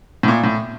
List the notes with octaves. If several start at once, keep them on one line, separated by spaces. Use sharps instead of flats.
A2
A#2
A2